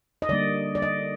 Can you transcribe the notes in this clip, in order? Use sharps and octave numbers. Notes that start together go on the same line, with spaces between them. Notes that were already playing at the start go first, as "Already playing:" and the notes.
D#5
D3 G3 A#3 D5
D5
D#5